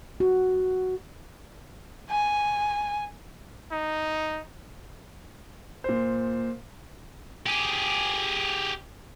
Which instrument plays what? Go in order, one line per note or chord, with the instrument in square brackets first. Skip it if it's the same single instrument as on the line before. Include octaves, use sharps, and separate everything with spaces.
[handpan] F#4
[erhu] G#5
[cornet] D#4
[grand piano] A#2 C5
[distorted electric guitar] G4 G#4